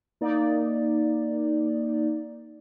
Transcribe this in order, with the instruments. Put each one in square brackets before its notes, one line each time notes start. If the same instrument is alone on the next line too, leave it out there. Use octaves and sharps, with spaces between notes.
[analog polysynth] A#3 D#4 D5